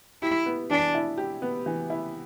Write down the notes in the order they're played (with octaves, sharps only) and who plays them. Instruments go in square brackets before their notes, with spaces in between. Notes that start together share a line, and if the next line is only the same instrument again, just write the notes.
[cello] E4 [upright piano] G4
[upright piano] B3
[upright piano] E3 [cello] D4
[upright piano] E4
G4
B3
E3
E4